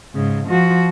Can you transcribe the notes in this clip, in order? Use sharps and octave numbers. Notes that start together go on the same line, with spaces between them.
G#2 C#3
F3 F#4